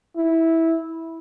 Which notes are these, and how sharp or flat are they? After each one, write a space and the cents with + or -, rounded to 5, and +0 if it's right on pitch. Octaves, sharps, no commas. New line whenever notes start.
E4 -10